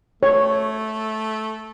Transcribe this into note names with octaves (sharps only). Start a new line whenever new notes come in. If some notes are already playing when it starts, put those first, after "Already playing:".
A3 C#5